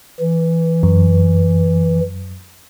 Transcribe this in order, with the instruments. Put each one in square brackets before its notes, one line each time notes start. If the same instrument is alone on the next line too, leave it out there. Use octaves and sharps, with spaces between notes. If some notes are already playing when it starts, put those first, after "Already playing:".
[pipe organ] E3
[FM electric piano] F#2